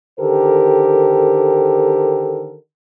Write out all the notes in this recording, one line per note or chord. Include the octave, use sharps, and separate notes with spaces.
D3 D#3 G4 A4 A#4 C5